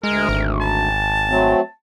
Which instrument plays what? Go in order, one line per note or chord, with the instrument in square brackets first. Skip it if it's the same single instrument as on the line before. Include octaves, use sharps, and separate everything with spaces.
[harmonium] D2 [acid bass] G#3 [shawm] A#4
[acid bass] G#1
[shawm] A5
[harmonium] F#3 A3 C4